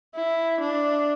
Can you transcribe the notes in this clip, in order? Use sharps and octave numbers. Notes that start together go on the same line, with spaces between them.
E4
D4